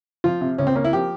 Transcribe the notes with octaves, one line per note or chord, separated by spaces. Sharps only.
F3 F4
C3
C#2 C#4
C4
A#3 C#4
E4
F3 G4